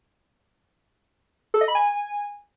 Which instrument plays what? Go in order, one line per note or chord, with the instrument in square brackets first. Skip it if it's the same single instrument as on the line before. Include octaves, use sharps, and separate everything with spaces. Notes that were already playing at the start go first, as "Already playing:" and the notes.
[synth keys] A4
D#5
B5
G#5